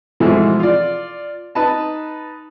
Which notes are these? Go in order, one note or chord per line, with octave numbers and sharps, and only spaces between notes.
G#2 B2 E3 F3 A3
F4 D5
D#4 B4 A5